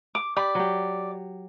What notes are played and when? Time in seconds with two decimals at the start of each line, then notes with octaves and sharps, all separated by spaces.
0.15 D6
0.36 G4 D5 B5
0.55 F#3 G4